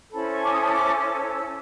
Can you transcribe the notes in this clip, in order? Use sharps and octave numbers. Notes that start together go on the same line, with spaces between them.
C#4 E4 A4 C5 B5
C#6
D6
D#6
D#6
D6
E6
E6